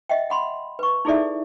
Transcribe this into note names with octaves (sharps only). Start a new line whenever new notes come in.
D#5 E5 F#5 G5
F#5 B5 C6
B4 C#6
D#4 E4 G#4 A4 D5 E5